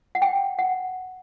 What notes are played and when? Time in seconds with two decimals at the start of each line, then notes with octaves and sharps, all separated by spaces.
0.15 F#5
0.22 G5
0.59 F#5